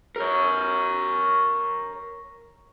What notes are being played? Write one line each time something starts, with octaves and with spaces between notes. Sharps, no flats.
A#4 C#5